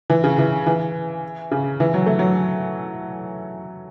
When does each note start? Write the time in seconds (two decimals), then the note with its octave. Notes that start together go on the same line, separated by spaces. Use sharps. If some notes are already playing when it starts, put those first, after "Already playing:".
0.10 E3
0.24 C#3
0.38 E3
0.66 E3
1.51 C#3
1.80 E3
1.94 F#3
2.06 A3
2.19 F#3